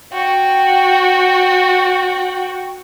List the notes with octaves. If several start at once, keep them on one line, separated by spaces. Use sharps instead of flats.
F#4 G5